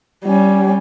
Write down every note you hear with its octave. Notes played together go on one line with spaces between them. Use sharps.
G3 C#4